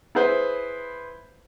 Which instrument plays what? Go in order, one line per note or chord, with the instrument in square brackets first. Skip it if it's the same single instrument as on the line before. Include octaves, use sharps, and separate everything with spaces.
[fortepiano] E4 G#4 B4 C5 E5